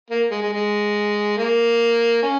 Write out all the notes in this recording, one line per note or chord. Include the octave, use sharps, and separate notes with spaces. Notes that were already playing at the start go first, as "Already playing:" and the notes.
A#3
G#3
G#3
G#3
A#3
C#4